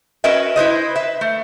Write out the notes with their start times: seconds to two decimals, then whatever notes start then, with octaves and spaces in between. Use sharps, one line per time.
0.24 C#4 F#4 A#4 B4 D#5 E5
0.56 E4 B4 C5 D#5
0.96 B4 E5
1.21 A3